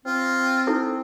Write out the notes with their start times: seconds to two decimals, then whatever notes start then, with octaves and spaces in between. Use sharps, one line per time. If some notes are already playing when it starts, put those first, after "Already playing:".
0.06 C4 F4
0.67 D#4 E4 A4